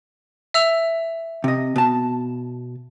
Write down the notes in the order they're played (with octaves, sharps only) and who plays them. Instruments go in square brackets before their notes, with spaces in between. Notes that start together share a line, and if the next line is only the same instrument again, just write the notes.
[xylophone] E5 E6 F7
[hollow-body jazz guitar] C3 D#5
B2 A5